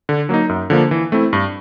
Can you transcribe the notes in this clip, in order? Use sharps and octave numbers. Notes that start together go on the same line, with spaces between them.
D3
F#3 A#3 D#4
F#2
D3 F3 A#3
E3
A3 C4 E4
G2